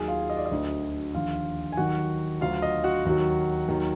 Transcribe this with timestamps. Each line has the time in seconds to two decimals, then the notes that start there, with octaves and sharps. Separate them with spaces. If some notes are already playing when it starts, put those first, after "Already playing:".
Already playing: D#2 D#3 F#3 G#4 G#5
0.08 F4 F5
0.30 D#5
0.37 D5
0.46 D#5
0.52 D2 D3 F#3
1.14 D#2 D3 F3 F4 F5
1.72 G#5
1.77 D#2 D#3 F#3 F#4 F#5
2.41 D2 D3 F#3 F4 F5
2.62 D#5
2.84 F#4 F#5
3.05 D#2 D#3 F#3
3.68 D#2 D#3 F#3